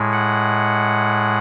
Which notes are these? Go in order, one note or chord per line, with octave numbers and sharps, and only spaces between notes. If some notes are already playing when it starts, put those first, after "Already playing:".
Already playing: A2 G#3
F#5